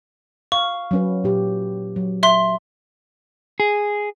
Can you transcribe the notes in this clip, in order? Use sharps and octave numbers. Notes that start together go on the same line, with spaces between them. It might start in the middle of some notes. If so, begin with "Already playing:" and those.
F5 C#6
F#3 C#4 B4
A#2 G4
F#3
E5 C6 G7
G#4